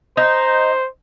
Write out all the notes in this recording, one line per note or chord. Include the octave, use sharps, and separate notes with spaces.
D#4 C5